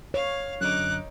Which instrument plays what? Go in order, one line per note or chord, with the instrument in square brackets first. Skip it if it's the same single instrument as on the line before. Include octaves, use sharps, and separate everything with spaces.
[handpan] C#5 [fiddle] F5
[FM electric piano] F#2 D3 [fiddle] D#4 D6 [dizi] F#6